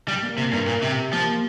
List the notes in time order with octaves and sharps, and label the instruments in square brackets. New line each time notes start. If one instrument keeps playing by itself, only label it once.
[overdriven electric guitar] G3
[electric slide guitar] A#3
[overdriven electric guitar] C3
[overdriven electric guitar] G2 [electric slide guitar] A#4
[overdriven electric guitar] A#2
[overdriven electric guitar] C3 [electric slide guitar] G4
[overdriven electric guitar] F3 [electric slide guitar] A#3